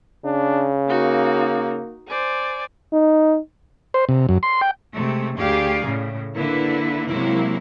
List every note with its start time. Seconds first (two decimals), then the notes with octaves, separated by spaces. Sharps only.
0.25 C#3 D4
0.88 A#3 D#4 F#4 A#4
2.08 C5 D5 G#5
2.93 D#4
3.94 C5
4.09 C3
4.29 F#2
4.43 C6
4.61 G5
4.94 C3 G#3 A3
5.39 D2 G4 G#4 D5 F5
5.84 A2 C#3
6.35 D3 A#3 E4 B4
7.09 C3 F#3 G#3 A#3 E4